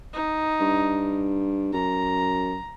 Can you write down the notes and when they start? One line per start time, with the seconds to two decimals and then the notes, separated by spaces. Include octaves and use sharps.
0.13 D#4
0.60 G2
1.73 F#2 A#5